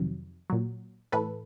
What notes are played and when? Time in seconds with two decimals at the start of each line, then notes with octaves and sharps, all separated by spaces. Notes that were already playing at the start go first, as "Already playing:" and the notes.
Already playing: F2 C3 D#3 F#3
0.50 A#2 F#3
1.12 A2 E3 A4 B4